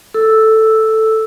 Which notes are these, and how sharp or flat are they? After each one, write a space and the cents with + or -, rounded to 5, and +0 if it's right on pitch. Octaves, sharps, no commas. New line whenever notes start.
A4 +0 E6 +0